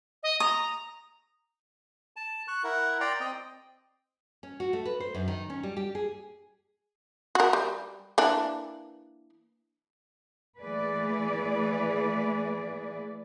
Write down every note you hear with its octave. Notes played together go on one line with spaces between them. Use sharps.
D#5
A#5 D#6
A5
C#6 F#6
E4 A#4 F#5
D5 G5 A#5 C6
C4 D#5 G5
C#4
F#4
A3
B4
C5
F#2
D#3
C#4
G3
G4
G#4
F#4 A#4
G3
E3 A#3 D4
E3 A3 A#3 G#4 B4 D5